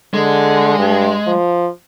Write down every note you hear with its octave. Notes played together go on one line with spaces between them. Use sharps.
D3 G#3
G2
F3